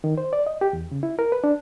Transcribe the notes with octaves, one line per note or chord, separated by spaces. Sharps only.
D#3
C5
D5
D#5
G4
E2
C#3
E4
A#4
B4
D4